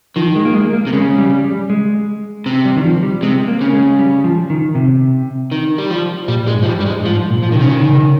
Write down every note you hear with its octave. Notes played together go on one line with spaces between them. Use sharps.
D#3 F3
G#3
A#3
G#3
A#3
C3
C#3 G#3
G3
G3
G#3
C3
G3
D#3
F3
G3
C3 G#3
A#3
C#3
G#3
G3
F3
D#3
C3
D#3
G3
F3
A#2 G3
G#3
G#2
F3
G3
G2 G3
G#3
G#2 F3
A#2
F3
C3 D#3
C#3
D#3
C#3
C#3